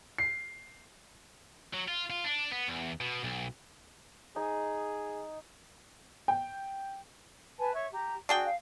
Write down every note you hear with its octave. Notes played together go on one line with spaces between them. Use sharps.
C7
F#3
F4
F4
D4
B3
E2
B2
B1
D#4 G#4 G#5
G5
B4 G#5 A5
C#5 E5 C#6
G4 A#5
D4 F#4 G#4 G5
F5